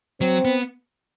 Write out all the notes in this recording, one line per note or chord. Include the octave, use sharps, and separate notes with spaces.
F#3 C4
B3